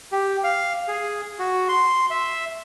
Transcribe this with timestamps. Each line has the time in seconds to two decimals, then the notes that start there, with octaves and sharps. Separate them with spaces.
0.12 G4
0.44 F5
0.88 G#4
1.39 F#4
1.69 C6
2.10 E5